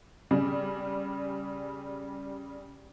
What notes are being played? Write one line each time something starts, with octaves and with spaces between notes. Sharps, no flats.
C#3 G3